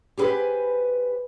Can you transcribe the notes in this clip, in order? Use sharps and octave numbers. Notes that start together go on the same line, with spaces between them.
G4 G#4 B4 C5 G#5